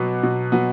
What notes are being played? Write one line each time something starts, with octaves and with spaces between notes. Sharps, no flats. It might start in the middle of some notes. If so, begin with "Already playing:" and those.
Already playing: B2 F#3 B3 D6
B2
F#3 B3